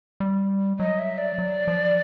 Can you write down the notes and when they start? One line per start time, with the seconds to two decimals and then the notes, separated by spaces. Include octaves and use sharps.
0.20 G3
0.79 F#3 D#5
0.99 E5
1.18 D5
1.38 F#3
1.68 F3